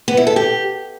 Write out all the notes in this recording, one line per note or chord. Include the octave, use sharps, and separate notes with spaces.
B3
E4
A4
G4